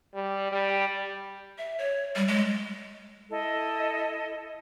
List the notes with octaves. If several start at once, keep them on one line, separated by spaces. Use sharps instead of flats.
G3
G3
E5
C#5
G3
G#3
E4 A4 D#5